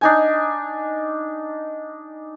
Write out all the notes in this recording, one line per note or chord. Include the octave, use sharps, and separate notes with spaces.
D4 D#4 G#5